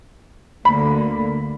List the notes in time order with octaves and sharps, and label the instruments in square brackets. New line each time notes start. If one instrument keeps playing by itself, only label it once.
[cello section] D2 D3 A#3 [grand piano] B5